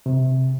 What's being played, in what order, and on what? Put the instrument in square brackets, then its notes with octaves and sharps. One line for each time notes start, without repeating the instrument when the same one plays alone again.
[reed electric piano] C3